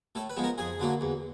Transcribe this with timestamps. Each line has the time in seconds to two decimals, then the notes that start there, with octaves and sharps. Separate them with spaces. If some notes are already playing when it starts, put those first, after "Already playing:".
0.15 A2 A4
0.30 B4
0.37 F3 G#3 B3
0.44 A#4
0.58 F2 G#4
0.80 D3 F#3 A#3
1.01 E2